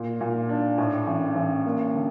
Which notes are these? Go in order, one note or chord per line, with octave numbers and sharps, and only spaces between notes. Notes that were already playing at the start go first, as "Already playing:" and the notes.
Already playing: A#2
A#2
D4
A2
A1
A1
A#3
D3